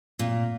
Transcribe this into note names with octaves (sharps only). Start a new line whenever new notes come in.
A#2